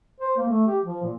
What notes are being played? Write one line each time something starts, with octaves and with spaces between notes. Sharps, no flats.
C5
A#3
A3
G4
F3
A#2